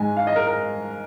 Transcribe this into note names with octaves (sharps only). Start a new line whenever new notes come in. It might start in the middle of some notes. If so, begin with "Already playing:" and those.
Already playing: G#2 G#3 G#5
F5
D#5
A#4
A#4